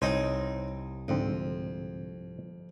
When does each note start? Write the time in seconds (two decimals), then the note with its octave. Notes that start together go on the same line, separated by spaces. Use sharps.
0.02 C2 C4 D#4 C5 C#5 D#5
1.08 F2 G#2 D3 C4